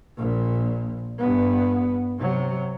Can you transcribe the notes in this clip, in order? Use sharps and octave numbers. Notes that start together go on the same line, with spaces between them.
A#1 A#2
G2 B3
C3 F#3